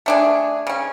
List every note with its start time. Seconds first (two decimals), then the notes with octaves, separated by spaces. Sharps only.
0.06 A3 D4 G#4
0.67 C#3 C#4